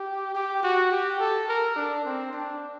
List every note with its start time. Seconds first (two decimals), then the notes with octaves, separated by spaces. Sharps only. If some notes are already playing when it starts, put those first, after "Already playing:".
Already playing: G4
0.35 G4
0.63 F#4
0.92 G4
1.20 A4
1.49 A#4
1.76 D4
2.05 C4
2.33 D4